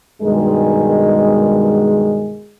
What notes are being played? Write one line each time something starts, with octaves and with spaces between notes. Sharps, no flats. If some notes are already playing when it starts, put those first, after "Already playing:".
G2 B2 D#3 G#3